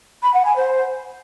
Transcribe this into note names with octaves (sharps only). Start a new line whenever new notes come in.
B5
F#5
G#5
C5